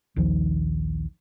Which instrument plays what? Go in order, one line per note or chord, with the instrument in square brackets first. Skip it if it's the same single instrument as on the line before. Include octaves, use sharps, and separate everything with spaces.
[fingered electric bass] A#1 D#2 D#3 F3